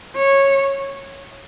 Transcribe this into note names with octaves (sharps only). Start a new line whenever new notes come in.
C#5